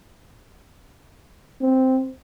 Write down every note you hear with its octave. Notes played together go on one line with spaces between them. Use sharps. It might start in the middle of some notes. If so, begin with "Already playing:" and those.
C4